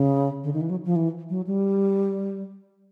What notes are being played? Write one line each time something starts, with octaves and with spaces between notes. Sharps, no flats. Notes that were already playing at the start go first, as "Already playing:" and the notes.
Already playing: C#3
D3
D#3
E3
F#3
F3
E3
F#3
G3